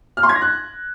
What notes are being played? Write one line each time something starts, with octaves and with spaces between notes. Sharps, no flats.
F6
C6
G#6
A#6
F#6